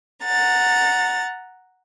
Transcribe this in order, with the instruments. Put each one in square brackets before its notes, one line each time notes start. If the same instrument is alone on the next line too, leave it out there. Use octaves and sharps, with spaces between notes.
[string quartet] F#5 A#5 A6